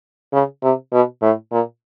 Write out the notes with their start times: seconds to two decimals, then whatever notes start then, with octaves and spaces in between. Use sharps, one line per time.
0.33 C#3
0.63 C3
0.93 B2
1.22 A2
1.52 A#2